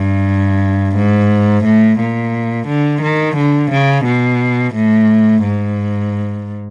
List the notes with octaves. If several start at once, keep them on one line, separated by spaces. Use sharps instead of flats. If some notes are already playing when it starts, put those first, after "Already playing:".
Already playing: G2
G#2
A2
A#2
D3
D#3
D3
C#3
B2
A2
G#2